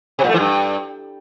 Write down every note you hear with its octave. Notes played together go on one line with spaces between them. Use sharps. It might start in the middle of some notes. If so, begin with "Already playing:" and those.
C3
A#2
A3
E3
G2